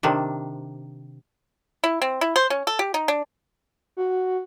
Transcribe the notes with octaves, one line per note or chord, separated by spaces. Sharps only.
C3 D#3 D4
E4
C4
E4
C5
C#4
A4
G4
D#4
D4
F#4